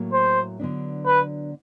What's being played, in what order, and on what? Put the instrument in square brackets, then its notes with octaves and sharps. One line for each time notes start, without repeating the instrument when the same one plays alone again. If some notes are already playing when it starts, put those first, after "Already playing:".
Already playing: [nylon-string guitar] A2 F#3 A#3
[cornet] C5
[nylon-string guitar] D3 F#3 B3 D4
[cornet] B4